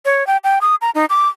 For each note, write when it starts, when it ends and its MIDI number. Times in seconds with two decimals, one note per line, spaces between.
0.05 0.26 73
0.27 0.37 79
0.44 0.59 79
0.61 0.75 87
0.81 0.90 82
0.95 1.05 63
1.10 1.28 86